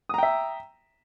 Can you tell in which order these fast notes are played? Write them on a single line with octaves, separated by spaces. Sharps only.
D#6 A#5 G5 E5